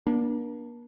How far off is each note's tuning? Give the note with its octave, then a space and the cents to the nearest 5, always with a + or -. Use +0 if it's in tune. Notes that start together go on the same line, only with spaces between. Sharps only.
A#3 +40 D4 +0